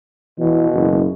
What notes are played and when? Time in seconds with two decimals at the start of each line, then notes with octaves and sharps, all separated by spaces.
0.40 B2 E3
0.74 F#1